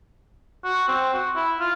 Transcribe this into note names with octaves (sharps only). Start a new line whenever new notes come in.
F#4
C4
F#4
E4
F4